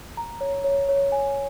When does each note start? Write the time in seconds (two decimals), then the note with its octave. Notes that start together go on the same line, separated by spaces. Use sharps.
0.17 A#5
0.41 C#5
0.64 C#5
0.89 C#5
1.12 G#5